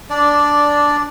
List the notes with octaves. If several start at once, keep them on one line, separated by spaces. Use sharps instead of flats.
D4 D5